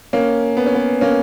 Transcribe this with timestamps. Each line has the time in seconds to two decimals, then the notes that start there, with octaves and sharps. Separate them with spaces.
0.13 A#3 C#4
0.57 B3
0.66 C#4
0.75 B3
1.01 A#3 C#4